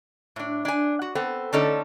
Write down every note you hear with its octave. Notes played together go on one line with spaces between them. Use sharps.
A2 D4
D4 G#5
F#4
B3 C4 A4
D3 A3 C#4 D#4 A4 D5